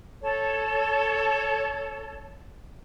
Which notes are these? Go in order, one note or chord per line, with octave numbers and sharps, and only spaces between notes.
A4 C#5